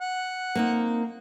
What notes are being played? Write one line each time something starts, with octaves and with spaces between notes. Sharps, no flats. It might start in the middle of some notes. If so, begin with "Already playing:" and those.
F#5
A#3 C4 D#4